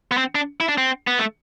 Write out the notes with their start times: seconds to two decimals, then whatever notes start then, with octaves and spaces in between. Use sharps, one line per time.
0.11 B3
0.17 C4
0.35 D4
0.60 E4
0.68 D4
0.78 C4
1.07 B3
1.19 A3